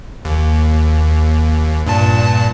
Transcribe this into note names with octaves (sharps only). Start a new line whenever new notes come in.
D#2
G2 A#2 A5